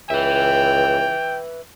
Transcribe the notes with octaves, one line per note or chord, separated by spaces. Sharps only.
C#2 B4 E5 G5